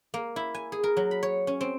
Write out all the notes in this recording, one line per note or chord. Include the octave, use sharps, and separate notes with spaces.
A#3
E4
G#5
G#4
A#4
F#3
B5
C#5
C#4
C4